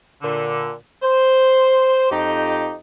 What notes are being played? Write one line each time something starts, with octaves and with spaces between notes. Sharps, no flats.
A#2 D3
C5
F2 D#4 G4